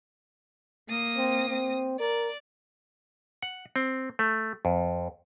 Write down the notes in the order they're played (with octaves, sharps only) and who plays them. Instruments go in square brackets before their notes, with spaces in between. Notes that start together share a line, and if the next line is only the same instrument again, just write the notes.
[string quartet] A#3 D#6 A#6
[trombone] C4
C4
[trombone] A#4 [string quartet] D5
[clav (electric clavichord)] F#5
C4
A3
F2